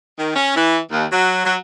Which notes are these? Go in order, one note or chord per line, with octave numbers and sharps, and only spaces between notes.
D#3
C#4
E3
D#2
F#3
F#3